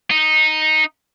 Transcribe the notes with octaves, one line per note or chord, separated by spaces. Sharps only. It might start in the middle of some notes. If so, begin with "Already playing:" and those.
D#4